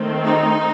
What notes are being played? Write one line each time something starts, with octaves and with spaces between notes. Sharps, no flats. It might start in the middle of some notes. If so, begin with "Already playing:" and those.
Already playing: D#3 A3 C4
D#4